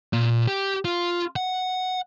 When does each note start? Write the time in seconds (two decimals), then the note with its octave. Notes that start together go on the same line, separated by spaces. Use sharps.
0.13 A#2
0.48 G4
0.85 F4
1.36 F#5